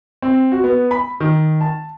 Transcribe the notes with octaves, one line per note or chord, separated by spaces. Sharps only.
C4
F#4
B3
B5
D#3
A5